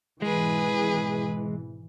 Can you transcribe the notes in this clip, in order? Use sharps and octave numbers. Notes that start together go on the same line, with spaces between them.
G#1 B2 E3 G#3 G#4 B4